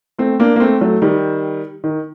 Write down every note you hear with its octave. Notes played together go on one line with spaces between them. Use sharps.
A3 C4
A#3 D4
A#3
A3 C4
F#3 A3
D#3 G3
D#3